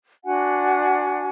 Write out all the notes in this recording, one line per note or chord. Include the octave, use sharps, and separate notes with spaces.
D4 F#4 F#5 G#5